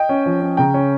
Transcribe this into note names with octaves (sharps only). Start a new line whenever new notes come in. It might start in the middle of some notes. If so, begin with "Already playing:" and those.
Already playing: D#5 G5
C#4
F3
C#4
C#3 G5 A#5
C#4